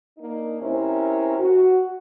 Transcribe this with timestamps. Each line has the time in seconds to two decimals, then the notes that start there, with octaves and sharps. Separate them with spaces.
0.18 A#3 D4 D#4
0.61 C3 C#4 E4 A#4 C5
1.38 F#4